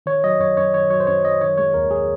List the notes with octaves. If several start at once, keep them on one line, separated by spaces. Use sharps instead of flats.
D#3 C#5
F#3 D#5
F#2 C#5
F#2 C#5
D#3 C#5
F#3 C#5
C5
F#2 C#5
F#2 D#5
D#3 C#5
G#3 C#5
D#2 A#4
G#4